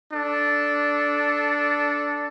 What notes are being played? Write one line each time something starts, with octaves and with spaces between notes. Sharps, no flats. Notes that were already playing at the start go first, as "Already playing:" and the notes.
D4 A4